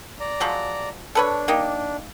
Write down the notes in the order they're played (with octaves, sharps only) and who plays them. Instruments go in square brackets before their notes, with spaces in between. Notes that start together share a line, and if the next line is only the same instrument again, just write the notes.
[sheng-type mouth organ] D5 A#5
[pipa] F3 F#3 G#3
[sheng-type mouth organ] D4 [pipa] A4 B4 C#5
[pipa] A#3 D#4 G4